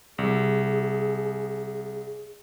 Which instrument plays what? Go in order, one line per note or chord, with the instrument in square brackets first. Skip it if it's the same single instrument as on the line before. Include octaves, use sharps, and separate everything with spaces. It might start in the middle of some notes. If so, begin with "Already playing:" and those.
[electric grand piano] C2 [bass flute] G#4